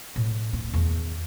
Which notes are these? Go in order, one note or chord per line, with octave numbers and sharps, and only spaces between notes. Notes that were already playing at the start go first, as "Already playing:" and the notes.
A2
C4
E2 D#3